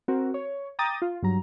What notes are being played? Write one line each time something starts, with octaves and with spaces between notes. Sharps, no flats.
C4 F#4 A#4
C#5
G5 A#5 D6 D#6 A6
F4
G2 F#3 A#5